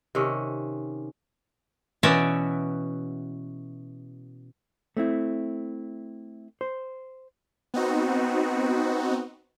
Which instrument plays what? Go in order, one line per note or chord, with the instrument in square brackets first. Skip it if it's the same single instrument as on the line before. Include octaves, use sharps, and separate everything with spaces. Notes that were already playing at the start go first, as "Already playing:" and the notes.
[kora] C3 D#3 C#4
[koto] B2 E3 C#4 F#4 D5 E5
[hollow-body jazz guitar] A3 C4 E4
C5
[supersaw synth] B3 C4 D#4 F#4